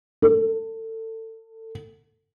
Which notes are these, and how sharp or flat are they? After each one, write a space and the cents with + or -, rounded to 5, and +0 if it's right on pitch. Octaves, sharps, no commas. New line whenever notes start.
A4 +25